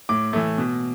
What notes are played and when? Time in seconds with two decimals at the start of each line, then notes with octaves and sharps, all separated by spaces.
0.09 A2 D6
0.33 E3 A3
0.58 B2